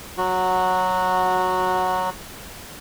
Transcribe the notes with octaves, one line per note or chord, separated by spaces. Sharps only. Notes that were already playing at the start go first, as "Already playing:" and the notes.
F#3 F#4